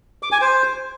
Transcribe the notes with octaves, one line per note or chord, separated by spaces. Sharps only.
D6
G#5
C5